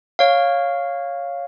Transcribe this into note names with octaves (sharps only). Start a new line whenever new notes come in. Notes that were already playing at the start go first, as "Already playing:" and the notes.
C#5 F5